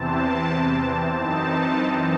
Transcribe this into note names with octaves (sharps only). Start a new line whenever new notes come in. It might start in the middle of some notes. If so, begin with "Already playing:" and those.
Already playing: E2 C3 E3 C4 A5
F#2 E3 C4 D#4 A5
A5